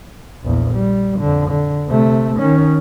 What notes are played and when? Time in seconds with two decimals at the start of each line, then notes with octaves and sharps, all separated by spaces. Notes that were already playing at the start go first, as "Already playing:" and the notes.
0.43 A#1 E2
0.74 G3
1.20 F2 D3
1.50 D3
1.88 C3 A3
2.40 D#3 C#4